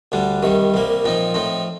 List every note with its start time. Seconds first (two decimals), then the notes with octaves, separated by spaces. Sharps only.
0.12 D2 D3 G3 D4
0.43 C2 C3 D#3 G3
0.74 C2 C3 G3 A#3
1.05 A#2 F3 C4 D#4
1.34 A2 F3 C4 D#4